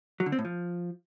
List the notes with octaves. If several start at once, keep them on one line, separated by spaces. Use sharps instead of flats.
F#3
D3
C4
A2
F3